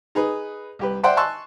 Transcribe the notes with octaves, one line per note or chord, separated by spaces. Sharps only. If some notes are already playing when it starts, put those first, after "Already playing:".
D#4 G#4 B4
C2 G4 B4
C5 D5 E5 F#5 G5 C6
G#5 A5 C6 C#6 E6 F#6